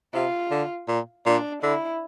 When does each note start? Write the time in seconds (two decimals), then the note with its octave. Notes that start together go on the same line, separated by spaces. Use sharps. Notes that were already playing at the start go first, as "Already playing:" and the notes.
0.14 C3 F4
0.51 D3
0.88 A#2
1.26 A#2 D4
1.63 D3 E4